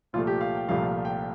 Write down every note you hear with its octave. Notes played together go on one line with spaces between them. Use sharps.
C2 A#2 F3 A3 F4
G4
F5
G5
C2 A#2 F3 A3 F5
F5
G5